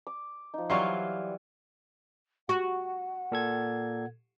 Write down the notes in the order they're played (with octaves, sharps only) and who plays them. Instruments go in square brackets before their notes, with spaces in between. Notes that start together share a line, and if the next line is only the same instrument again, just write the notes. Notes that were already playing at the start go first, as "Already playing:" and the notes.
[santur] D6
F3 D#4
[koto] E3 F#3 F4 [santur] G3 D5 [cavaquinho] C5 F5 C#6
[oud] F#4 [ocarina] F#5
[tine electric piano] A#2 A4 G#6